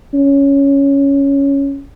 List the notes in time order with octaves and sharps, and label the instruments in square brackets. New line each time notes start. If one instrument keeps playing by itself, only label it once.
[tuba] C#4